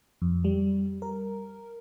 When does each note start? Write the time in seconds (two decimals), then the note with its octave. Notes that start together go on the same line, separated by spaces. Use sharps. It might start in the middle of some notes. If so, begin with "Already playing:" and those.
0.22 F2
0.44 G3
1.02 A#4